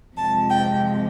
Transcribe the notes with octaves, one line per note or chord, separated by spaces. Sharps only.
F2 C3 F3 G#3 A5
G5